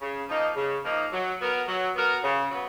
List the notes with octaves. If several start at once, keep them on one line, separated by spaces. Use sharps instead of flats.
C#3
F3 A#3 D#4
C#3
F3 A#3 D#4
F#3
B3 F#4 A#4
F#3
B3 F#4 A#4
C#3
F#3 B3